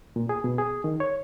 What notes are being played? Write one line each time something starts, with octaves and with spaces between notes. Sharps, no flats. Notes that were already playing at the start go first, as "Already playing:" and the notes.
A#2
G#4
B2
G#4
D#3
C#5